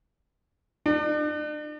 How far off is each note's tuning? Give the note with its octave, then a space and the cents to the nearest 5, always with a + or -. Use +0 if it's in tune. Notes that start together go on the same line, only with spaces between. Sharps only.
D4 +40